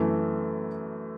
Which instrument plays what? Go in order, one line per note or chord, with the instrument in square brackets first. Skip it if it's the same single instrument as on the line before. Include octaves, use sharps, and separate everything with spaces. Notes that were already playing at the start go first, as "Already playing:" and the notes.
Already playing: [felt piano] F#2 E3 A3